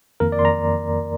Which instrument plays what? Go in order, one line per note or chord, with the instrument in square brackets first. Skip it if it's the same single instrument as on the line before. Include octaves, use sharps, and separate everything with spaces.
[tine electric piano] F2 D#3 A#3 A#4
D5
C6
A#5